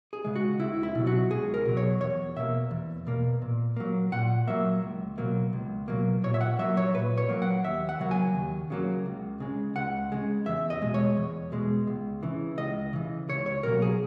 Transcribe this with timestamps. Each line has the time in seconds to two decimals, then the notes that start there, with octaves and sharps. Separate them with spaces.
0.13 G#4
0.25 C#3 G#3
0.36 F#4
0.60 C#2 E4
0.83 E4
0.95 B2 F#3
1.07 F#4
1.30 C#2 G#4
1.54 A#4
1.65 B2 F#3
1.77 C#5
2.01 E2 C#5
2.36 B2 A#3 E5
2.71 E2
3.07 B2 A#3
3.42 A#2
3.76 F#3 A#3
4.12 A#2 F#5
4.47 F#3 A#3 E5
4.82 C#2
5.18 B2 F#3 A#3
5.53 C#2
5.88 B2 F#3 A#3
6.24 A#2 C#5
6.34 E5
6.41 F#5
6.59 F#3 A#3 E5
6.77 C#5
6.94 A#2 B4
7.18 C#5
7.29 F#3 A#3
7.42 F#5
7.65 D#2 E5
7.89 F#5
7.99 C#3 F#3 A#3
8.11 G#5
8.35 D#2
8.70 C#3 F#3 A#3
9.06 C#2
9.40 C#3 G#3
9.76 C#2 F#5
10.12 C#3 G#3
10.46 E2 E5
10.70 D#5
10.82 B2 G#3
10.94 C#5
11.17 E2
11.52 B2 G#3
11.87 C#2
12.23 C#3 E3
12.58 C#2 D#5
12.93 C#3 E3
13.29 C#2 C#5
13.46 C#5
13.63 B2 F#3 A#3 A#4
13.82 G#4